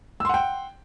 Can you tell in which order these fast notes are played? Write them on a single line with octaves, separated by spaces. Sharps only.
E6 C6 F#5 G5